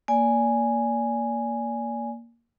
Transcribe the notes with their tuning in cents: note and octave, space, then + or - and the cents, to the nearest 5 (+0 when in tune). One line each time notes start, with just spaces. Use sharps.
A#3 +0 D5 -25 G#5 +0